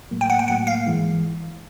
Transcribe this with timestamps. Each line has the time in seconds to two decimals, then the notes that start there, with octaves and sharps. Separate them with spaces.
0.11 A2 F#3 A#3
0.21 G5
0.30 F#5
0.39 G5
0.48 A2 F#3 A#3 F#5
0.67 F5
0.86 G#2 E3 G#3